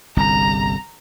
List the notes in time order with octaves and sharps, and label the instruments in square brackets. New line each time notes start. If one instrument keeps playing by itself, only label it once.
[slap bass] G1 C2 [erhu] A#5